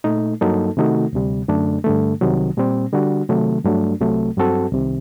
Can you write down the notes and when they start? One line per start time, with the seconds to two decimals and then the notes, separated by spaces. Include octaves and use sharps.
0.04 A#2 A3 D#4
0.41 G2 F#3 A#3 D#4 A4
0.77 C3 D#3 A3 D#4 F#4
1.13 D2 C3 G3
1.48 F#2 D3 A3 D4
1.84 G2 D3 A3
2.21 C2 C3 D#3 F#3
2.57 A#2 G3 C4
2.93 D3 G3 D4 F#4
3.29 C3 D#3 F#3 A3
3.64 G2 F#3 A3 D4
4.01 C2 C3 F#3 A3
4.37 G2 F#3 C4 F#4 A4
4.73 C2 C3 D#3